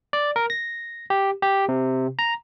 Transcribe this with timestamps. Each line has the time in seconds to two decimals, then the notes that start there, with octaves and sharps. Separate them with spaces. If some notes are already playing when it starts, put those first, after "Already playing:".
0.13 D5
0.36 A#4
0.50 A#6
1.10 G4
1.42 G4
1.69 C3
2.19 A#5